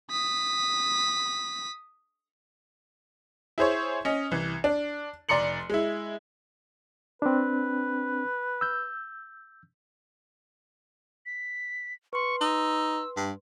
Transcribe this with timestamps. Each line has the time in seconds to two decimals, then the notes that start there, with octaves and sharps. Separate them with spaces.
0.11 D#6 B6
3.58 E4 G#4 C5 C#5
4.05 C#4 D#5
4.31 C2 E3
4.64 D4
5.29 F1 D5 A#5 C6 C#7 F#7
5.70 G#3 E4
7.22 C4 D4 B4
8.61 E6 G6
11.26 B6
12.13 B4 C6 C#6
12.41 D#4 E6
13.16 G2